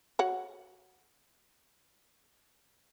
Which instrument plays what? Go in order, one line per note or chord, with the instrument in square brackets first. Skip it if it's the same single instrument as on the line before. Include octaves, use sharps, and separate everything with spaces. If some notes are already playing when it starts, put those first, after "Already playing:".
[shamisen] F#4 C#5 F#5